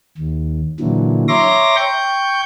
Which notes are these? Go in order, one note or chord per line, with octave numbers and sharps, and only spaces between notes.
D#2
A#2 D3 E3 F#3
C#5 E5 A#5 C6 D6 A#6
G5 C#6 G6